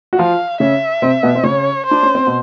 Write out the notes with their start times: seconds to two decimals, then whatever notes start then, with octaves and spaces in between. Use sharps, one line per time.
0.13 F#4
0.19 F3 F4 F5
0.60 C#3 C#4 E5
1.02 C3 C4
1.23 B2 B3
1.35 C4
1.43 C#3 C#4 C#5
1.85 C5
1.91 D4
2.03 C#4
2.15 C4
2.27 B2